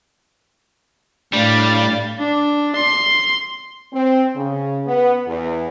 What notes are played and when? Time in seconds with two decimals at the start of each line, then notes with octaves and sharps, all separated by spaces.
1.33 A2 G3 D4 F5 A6
2.19 D4
2.75 C6
3.93 C4
4.35 C#3
4.86 B3
5.27 E2